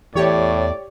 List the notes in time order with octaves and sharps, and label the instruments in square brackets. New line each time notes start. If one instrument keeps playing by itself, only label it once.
[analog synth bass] E2 [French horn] A2 [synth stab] G4 C#5 [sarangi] D5